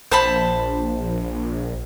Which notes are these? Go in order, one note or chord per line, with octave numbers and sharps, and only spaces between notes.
A#1 C5 A5 B5